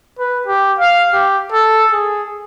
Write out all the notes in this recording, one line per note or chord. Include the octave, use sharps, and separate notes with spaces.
B4
G4
F5
G4
A4
G#4